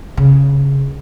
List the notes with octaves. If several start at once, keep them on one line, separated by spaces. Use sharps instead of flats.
C#3